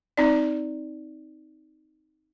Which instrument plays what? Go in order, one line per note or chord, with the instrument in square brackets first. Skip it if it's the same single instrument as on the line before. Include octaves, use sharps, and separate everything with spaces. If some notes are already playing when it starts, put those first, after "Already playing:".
[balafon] C4 D#4 D5